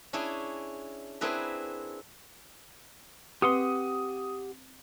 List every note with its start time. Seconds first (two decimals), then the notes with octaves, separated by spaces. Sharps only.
0.13 C#4 D4 E4 G#4
1.21 C4 D4 E4 G#4 A#4 B4
3.42 C4 G4 B4 F#5 C6 D#6